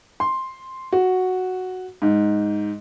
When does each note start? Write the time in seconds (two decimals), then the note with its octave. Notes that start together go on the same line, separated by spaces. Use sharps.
0.20 C6
0.92 F#4
2.02 G#2